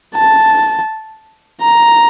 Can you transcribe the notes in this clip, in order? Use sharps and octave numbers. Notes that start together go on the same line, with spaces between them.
A5
A#5